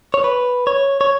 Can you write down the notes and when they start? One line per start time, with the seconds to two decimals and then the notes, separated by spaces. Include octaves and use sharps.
0.14 C#5
0.24 B4
0.67 C#5
1.01 C#5